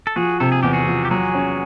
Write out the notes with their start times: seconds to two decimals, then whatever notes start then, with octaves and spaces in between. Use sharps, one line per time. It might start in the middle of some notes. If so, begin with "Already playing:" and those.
0.07 A4
0.16 F3 F#4 G#4
0.40 C3 A4
0.52 G#4
0.63 E2 G4
0.73 F#4 G#4
0.87 F3
1.05 G4
1.10 F#3 F#4 G#4
1.35 C#4